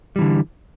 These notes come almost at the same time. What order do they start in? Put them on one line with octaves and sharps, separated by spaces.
G3 E3 D3